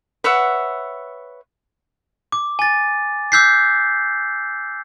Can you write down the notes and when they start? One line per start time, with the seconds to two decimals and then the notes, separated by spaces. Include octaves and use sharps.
0.24 B4 C#5 E5 F#5
2.32 D6
2.59 G#5 A6
3.32 D6 E6 F#6 G6 B6 C7